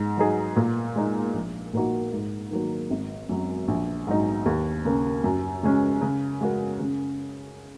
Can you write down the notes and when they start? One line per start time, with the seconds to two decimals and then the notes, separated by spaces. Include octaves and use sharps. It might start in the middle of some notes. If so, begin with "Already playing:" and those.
Already playing: G#2
0.17 F#3 D#4 G#4
0.56 A#2
0.96 G#3 D#4
1.34 A#1
1.73 A#2 A#3 D#4 F#4
2.12 G#2
2.51 D#3 F#3 A#3
2.90 G#1
3.29 F#2 F#3
3.68 A#1
4.07 G#2 F#3 D#4
4.46 D#2
4.85 C#3 A#3
5.24 F#2
5.63 C#3 G#3 C#4
6.01 C#3
6.41 G#3 F#4 A#4
6.80 C#3